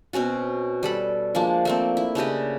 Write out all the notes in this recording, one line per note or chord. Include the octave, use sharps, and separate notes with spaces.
B2 C4 C#4 F#4
G3 A4 B5
F3 G#3 A#3 D4
A3 A#3 C4
E4
C#3 D4 G4 D#5